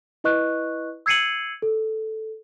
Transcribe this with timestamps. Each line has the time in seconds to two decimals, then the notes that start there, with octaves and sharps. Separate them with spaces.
0.24 E4 B4 D#5 C#6 F#6
1.06 E6 G#6 C7 C#7 D#7 F#7
1.62 A4